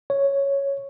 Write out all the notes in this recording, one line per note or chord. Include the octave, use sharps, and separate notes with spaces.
C#5